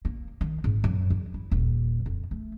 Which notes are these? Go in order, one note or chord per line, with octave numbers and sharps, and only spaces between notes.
A#3
D#3
G#1
F#2
E2
E4
D#1
F2
A3